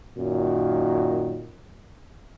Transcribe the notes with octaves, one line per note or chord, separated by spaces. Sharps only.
F#2 A#2 D#3 F#3